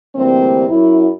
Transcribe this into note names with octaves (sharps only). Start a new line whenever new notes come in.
D2 C3 E3 G3 A#3 C4
F#2 E4